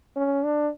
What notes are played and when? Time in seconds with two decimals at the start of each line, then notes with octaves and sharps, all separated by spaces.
0.16 C#4
0.44 D4